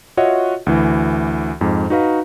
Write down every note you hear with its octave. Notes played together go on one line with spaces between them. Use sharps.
F4 F#4 C#5 D#5 E5 F#5
D2 E3
F2 G#2
D#4 F#4 B4 F5 A#5